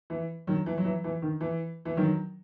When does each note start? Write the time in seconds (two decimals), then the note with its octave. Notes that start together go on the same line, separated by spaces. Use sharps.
0.10 E3
0.47 D#3 F#3
0.66 E3
0.78 F#3
0.85 E3
1.04 E3
1.22 D#3
1.41 E3
1.85 E3
1.97 D#3 F#3